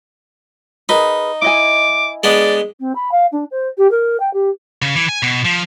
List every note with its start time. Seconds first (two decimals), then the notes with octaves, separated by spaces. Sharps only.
0.89 D#4 G#4 A#4 B4
1.42 E4 D#5 G#5 D6
2.24 G#3 B3 D4 D5
2.80 C4
2.95 B5
3.11 F5
3.32 D4
3.51 C5
3.78 G4
3.91 A#4
4.20 G5
4.33 G4
4.82 C#3
4.95 E3
5.09 G#5
5.23 B2
5.45 F3